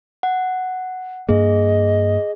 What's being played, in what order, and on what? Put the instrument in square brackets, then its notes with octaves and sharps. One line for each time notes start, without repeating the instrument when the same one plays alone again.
[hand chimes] F#5
[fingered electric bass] G2 A#3 [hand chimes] G#4 [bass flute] D#5